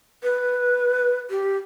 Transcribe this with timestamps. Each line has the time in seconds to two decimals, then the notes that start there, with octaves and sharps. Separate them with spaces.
0.23 B4
1.30 G4